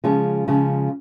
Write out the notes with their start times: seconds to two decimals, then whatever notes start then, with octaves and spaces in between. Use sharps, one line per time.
0.04 C#3 F3 G#3 C#4 G#4
0.47 C#3 F3 G#3 C#4 G#4